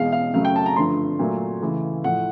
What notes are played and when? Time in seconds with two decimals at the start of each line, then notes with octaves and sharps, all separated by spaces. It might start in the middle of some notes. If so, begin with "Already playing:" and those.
Already playing: E2 B2 G#3 F5
0.12 F5
0.34 F#2 C#3 F#3 A3 F5
0.45 G5
0.56 A5
0.66 A#5
0.76 G2 D3 F3 A3 C6
1.19 A#2 F#3 A3
1.61 C#2 C#3 E3 A3
2.04 A2 F3 A3 F#5